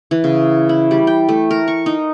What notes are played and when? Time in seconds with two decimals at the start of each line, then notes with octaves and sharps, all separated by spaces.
0.11 E3
0.24 C#3
0.69 E4
0.91 G3
1.07 G5
1.29 A3
1.51 A#4
1.68 C#6
1.86 D#4